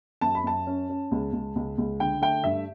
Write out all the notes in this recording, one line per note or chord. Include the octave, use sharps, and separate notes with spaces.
F#2 A5
B5
F#2 A5
C#4
C#4
C#2
C#2
C#2
C#2
D3 G5
A3 G5
G2 E5